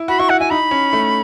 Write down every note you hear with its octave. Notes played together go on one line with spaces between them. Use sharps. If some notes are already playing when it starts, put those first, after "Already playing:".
Already playing: E4
F#4 B5
E4 C#6
E4 F#5
E4 G#5
D#4 B5
C#4
A3